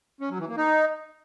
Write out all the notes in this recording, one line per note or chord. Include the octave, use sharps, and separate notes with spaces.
C#4
F#3
E3
A#3
D#4